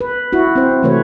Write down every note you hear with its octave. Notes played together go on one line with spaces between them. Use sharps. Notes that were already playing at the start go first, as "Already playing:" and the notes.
B4
E4 F#4
C4 C5
C3 E3 A3 F#4 B4 C#5